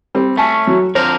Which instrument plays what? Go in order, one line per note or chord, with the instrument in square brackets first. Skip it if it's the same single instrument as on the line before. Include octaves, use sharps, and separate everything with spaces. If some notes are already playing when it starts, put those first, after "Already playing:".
[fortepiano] G3 C4
[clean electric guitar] A3 C#4 [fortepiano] G#5 A5
[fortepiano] F#3
[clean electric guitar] F2 D3 A#4 [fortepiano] C5